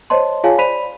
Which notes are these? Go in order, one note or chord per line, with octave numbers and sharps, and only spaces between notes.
C5 C#5 D#5 A5 C6
F4 G#4 C#5 F5 G#5 A5
C5 D5 B5 B6 D#7 F7